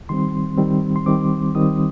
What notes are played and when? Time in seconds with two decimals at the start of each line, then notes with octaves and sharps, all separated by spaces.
0.09 D#3 G3 C4 C6
0.58 D#3 G3 C4
0.96 C6
1.06 D#3 G3 C4 D6
1.55 D#3 G3 C4 D#6